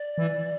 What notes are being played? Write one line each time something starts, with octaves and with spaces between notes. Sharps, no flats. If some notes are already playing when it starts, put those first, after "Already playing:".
Already playing: D5
E3